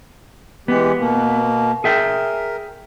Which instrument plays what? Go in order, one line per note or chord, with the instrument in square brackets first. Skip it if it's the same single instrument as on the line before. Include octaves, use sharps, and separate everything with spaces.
[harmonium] E3 G#3 G4 [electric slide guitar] B3
[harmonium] B2 A#3
[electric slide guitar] G#4 E5 G5 [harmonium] A#4